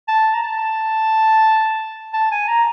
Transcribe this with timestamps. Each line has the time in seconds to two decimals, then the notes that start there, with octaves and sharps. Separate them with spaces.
0.08 A5
0.34 A#5
0.43 A5
2.13 A5
2.31 G#5
2.48 A#5